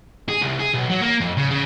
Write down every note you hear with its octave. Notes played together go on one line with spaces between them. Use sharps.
G#4
C2
G#4
B1
F#3
A#3
F2
C#3
C#3